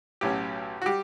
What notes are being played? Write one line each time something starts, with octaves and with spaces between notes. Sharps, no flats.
B1 A2 F#3 C#4 G4
F#4
G3 G4